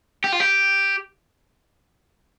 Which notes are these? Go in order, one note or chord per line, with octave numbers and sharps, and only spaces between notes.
G4
F4
G4